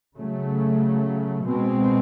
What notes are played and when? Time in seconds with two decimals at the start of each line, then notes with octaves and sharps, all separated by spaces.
0.15 C#3 F#3 A3
1.44 B2 G#3 C4